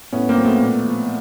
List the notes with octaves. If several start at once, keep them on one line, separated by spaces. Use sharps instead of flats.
A2 B3 C#4
A#3 C4
F#3
A3 B3
A#2
F3